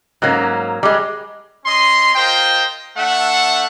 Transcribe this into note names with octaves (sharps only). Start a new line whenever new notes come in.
G#2 F#3 A#3 C#4
G3 G#3
C#4 D#5 C6
F4 A#4 C5 D#5 G5
A3 D4 E5 F#5